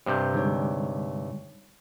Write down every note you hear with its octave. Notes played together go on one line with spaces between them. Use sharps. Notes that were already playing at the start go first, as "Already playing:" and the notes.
G2 C3 G4 C5 G6
D3 G3 G#3 D#4 C#5